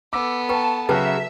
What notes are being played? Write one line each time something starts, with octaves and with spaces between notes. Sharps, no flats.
B3 A4 D6 E6
B4 G5 A5 A#5 C#6
C#3 F#3 F#4 B4 E5 G5 A5